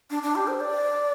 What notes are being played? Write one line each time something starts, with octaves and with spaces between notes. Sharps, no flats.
D4
D4
G4
C5
D5